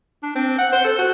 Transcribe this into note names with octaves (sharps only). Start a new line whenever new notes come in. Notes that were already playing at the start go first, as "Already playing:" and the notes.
D4
C4
F#5
C5
A4
F#4